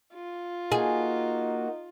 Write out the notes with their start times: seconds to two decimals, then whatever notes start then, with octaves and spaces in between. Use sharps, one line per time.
0.14 F4
0.72 A#3 D#4 F#4 G#4